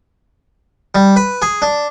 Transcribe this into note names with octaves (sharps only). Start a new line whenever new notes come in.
G3
B4
G#4
D4